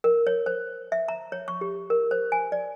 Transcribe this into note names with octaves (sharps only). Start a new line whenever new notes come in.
A#4
C#5
C5
E5
A#5
C#5
C#6
G4
A#4
C5
G#5
D5